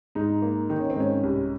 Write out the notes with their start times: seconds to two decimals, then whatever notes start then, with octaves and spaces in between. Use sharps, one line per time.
0.15 G#2 D#4
0.42 A#3
0.69 D#3 D#4
0.80 C#4
0.90 C4
0.96 G#2 C#4
1.23 C2